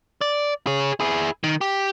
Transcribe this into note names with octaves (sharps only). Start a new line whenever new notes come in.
D5
G#4 C#5
E4 G#4
D#3
G4